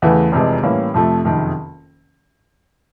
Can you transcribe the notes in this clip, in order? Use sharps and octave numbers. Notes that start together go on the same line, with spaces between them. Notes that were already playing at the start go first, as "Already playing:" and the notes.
E2 C#3 E3 A3
F1 F2 C3 E3 G#3
A2 E3 G3 A#3 C#4
F2 C3 F3 A3
F#1 F2 C3 D#3